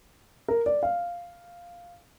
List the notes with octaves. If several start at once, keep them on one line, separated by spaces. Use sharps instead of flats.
A#4
D5
F5